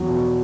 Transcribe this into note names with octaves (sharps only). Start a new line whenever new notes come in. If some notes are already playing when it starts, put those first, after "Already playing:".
Already playing: E2 F#3
B2